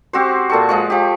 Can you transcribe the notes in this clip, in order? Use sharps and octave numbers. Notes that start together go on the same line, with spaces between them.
C4 F#4 G4 C5
A#2 A4 C#6
F3 G#3 C#6
F3 G4